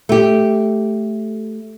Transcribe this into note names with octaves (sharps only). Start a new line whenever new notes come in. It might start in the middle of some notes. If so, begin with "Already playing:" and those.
A3 G4